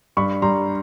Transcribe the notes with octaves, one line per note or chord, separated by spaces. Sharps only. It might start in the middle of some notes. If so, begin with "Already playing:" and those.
G2 B5 C#6
G3 A#5 C6